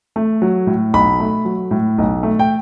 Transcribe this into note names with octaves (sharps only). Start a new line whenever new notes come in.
A3
F#3
A2
B1 B5
A3
F#3
A2
B1
A3
G5